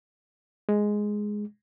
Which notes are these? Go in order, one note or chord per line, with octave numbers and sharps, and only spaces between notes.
G#3